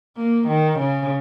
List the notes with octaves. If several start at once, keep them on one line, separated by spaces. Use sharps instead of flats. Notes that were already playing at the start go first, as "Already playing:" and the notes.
A#3
D#3
C#3